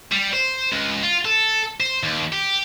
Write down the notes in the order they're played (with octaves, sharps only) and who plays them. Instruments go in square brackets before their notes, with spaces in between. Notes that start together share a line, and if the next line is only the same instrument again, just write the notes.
[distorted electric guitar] G3
C5
C#2
F4
A4
C5
D#2
G4